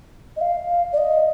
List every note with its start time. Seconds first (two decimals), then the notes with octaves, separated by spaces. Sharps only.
0.37 D#5
0.41 F5
0.93 D5
0.98 D#5